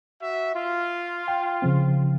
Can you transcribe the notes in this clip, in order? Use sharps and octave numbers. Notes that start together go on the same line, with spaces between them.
F#4 E5
F4
G5
C#3 F3 C4